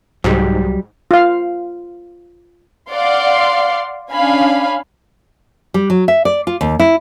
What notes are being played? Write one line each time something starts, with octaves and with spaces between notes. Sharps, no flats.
C2 G#2 F#3 G3
F4 F5
D5 F5 F#5 C6
C#4 D4 F5 G#5 B5
G3
F#3
E5
D5
F4
D#2
E4